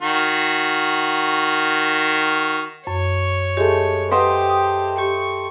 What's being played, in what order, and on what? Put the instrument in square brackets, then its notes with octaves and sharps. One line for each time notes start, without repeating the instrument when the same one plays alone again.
[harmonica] D#3 F#4
[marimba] F#2 [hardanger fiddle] C#5
[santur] G#3 A3 [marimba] G4
[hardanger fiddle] G4 [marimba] B4 F#5 C6 [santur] C5 D#5 G5
[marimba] D#6
[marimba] G4 [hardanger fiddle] C#6